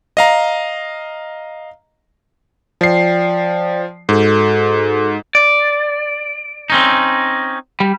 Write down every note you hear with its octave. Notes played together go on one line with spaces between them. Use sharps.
D#5 F5 A#5
F3 D5 G5 C7
G#2 F#4 A4
D5
C4 C#4 D#4
G3